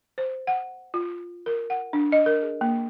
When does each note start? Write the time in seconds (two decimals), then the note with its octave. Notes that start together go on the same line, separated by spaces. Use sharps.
0.18 C5
0.47 F#5
0.94 F4
1.46 A#4
1.70 F#5
1.93 D4
2.12 D#5
2.26 A#4
2.42 G#4
2.61 A#3